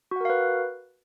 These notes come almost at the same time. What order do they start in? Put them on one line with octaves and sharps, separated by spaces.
F#4 F#5 A#4 F5 B4